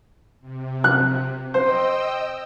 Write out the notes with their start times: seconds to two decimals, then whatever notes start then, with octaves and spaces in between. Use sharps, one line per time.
0.41 C3
0.84 F#6
1.54 C5 D#5 G5 E6